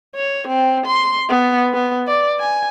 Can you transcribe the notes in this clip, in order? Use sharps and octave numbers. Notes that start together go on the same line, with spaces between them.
C#5
C4
C6
B3
B3
D5
G#5